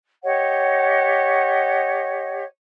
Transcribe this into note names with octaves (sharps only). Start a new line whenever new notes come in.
G4 C#5 D#5 F#5